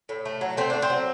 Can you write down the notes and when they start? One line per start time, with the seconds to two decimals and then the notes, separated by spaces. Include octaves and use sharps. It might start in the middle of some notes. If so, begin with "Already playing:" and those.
0.09 A2
0.25 A3
0.41 F#3
0.57 A3 C4
0.70 A3 D4
0.82 C4
0.90 F#3